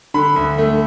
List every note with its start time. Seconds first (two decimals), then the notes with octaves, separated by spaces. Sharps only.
0.14 D3 B5
0.36 D2
0.58 A3